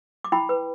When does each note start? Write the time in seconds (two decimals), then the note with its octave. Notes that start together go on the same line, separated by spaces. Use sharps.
0.24 D6
0.32 E4 G5 B5
0.49 B4